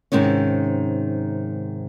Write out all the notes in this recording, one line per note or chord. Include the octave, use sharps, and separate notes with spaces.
G#2 C3 D#3 G#3 C#4